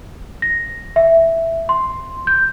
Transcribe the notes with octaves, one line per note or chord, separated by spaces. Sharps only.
A#6
E5
C6
G6